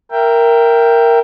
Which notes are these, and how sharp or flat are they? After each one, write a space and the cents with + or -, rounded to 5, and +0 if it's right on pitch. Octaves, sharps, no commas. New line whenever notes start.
A#4 +0 E5 +25 G5 +0